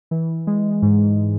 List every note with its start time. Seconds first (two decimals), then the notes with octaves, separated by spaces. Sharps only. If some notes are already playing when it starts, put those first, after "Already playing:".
0.11 E3
0.47 G#3
0.82 G#2